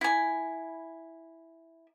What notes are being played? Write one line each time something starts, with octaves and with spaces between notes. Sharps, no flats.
E4 G#5